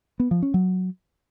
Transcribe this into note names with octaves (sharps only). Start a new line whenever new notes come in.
B3
F3
C#4
F#3